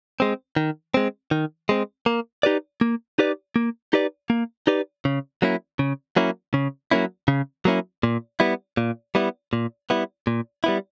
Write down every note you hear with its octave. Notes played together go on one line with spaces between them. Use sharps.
G#3 C4
D#3
G#3 C4
D#3
G#3 C4
A#3
D#4 G4 B4 D5
A#3
D#4 G4 B4 D5
A#3
D#4 G4 B4 D5
A#3
D#4 G4 B4 D5
C#3
F#3 A#3 C#4 E4
C#3
F#3 A#3 C#4 E4
C#3
F#3 A#3 C#4 E4
C#3
F#3 A#3 C#4 E4
A#2
G3 B3 E4
A#2
G3 B3 E4
A#2
G3 B3 E4
A#2
G3 B3 E4